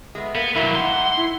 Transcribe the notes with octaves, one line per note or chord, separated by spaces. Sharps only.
G#3 A3 B3
A#3 B3
B2 D#3 F#3 A#3 E4
E2 G#2 F#5 C6
E4